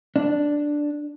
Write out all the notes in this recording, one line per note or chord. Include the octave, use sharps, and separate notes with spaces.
D4